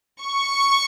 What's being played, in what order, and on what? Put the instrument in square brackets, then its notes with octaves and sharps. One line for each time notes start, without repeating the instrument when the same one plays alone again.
[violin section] C#6